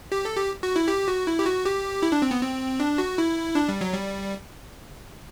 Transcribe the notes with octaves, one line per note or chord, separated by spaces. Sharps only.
G4
A4
G4
F#4
E4
G4
F#4
E4
G4
F#4
G4
E4
D4
C4
B3
C4
D4
F#4
E4
D4
G3
F#3
G3